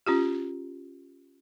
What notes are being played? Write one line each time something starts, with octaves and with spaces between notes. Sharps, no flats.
C#4 F4 G4